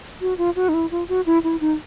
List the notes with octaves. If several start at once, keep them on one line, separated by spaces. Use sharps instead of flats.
F#4
F4
F#4
D#4
E4
F4
F#4
E4
E4
D#4